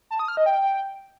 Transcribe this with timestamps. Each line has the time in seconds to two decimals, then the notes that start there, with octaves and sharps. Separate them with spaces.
0.11 A5
0.19 D#6
0.28 F6
0.37 D#5
0.46 G5